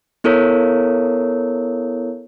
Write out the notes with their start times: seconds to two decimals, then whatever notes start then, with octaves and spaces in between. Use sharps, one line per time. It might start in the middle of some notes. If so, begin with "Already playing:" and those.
0.24 B3 E4 A4 A#4 C#5